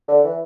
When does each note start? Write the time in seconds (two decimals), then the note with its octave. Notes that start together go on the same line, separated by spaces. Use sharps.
0.08 D3
0.24 E3